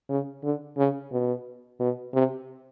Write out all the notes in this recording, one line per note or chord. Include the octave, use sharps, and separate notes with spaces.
C#3
D3
C#3
B2
B2
C3